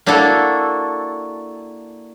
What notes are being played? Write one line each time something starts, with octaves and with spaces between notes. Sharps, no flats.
A#3 D4 E4 F#4 A4